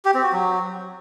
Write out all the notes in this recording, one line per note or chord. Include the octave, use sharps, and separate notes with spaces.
G4
C4
F#4
F#3